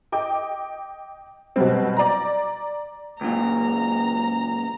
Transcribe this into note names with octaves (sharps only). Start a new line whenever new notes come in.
D#5 G5 D6
B2 F#3 G3 C4
D5 A#5
C#2 A#2 A#5